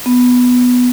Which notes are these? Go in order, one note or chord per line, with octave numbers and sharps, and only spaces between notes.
B3